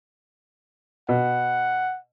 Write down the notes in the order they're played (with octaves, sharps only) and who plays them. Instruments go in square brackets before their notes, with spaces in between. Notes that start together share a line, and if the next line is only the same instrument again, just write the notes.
[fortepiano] B2 [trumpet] F#5